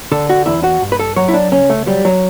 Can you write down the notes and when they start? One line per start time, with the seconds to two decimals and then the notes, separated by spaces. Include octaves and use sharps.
0.12 D3 A4
0.29 F#4
0.46 E2 E4
0.64 F#4
0.82 G2
0.92 B4
0.99 A4
1.16 F#3 C#5
1.28 E4
1.34 D4
1.52 C#2 C#4
1.70 A3
1.86 F#3 G3
2.05 F#3